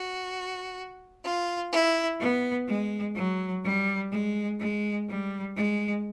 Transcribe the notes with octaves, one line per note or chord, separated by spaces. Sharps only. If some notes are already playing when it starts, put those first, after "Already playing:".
Already playing: F#4
F4
E4
B3
G#3
F#3
G3
G#3
G#3
G3
G#3